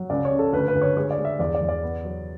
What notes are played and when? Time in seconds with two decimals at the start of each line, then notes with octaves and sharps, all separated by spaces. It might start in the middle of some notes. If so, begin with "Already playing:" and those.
Already playing: F#3
0.10 C#2 D5
0.25 C#5
0.31 C#3
0.39 A4
0.53 D2 B4
0.68 B4
0.75 D2
0.82 C#5
0.97 G#3 C#5
1.11 D5
1.18 G#3
1.25 E5
1.39 E2 D5
1.55 D5
1.61 E2
1.69 D5
1.83 B3
2.05 F#3